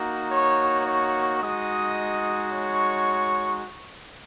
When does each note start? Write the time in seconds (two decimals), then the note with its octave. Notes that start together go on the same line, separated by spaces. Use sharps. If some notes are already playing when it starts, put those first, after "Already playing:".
Already playing: A#3 D#4 F#4
0.31 C#5 C#6
0.87 C#5 C#6
1.42 G#3 D#4 F#4 D#5 D#6
2.52 C#5 C#6